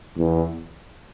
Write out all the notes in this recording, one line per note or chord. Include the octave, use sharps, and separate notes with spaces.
E2